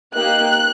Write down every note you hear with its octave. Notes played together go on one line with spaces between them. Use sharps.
A#3 D#4 G4 F#6